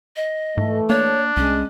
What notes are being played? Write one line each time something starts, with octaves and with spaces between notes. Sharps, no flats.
D#5
G#2 E3 A3
A#3 D4 C#5
C2 G#3 C#4